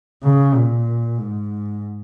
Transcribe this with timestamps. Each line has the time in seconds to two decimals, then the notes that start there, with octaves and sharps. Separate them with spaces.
0.23 C#3
0.55 A#2
1.18 G#2